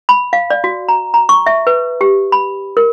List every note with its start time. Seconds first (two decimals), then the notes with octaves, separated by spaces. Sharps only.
0.09 B5
0.33 F5
0.50 D5
0.64 F#4
0.88 A#5
1.14 A#5
1.29 C#6
1.46 E5
1.67 B4
2.01 G4
2.32 B5
2.77 A#4